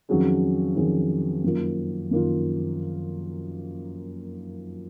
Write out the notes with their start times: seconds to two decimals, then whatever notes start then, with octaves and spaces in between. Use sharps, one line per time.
0.09 F2 D#3 F#3 C#4 G#4
0.76 F2 D#3 F#3 C#4 G#4
1.44 F#2 D#3 A#3 F4
2.11 F#2 D#3 A#3 F4